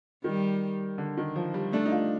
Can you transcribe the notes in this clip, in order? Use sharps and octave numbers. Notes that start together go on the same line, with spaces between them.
D#3 G3
D3
D#3
F3
G3
A3 D4
D#4
F4